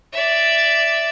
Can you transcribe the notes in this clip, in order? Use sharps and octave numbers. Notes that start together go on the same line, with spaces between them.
D5 E5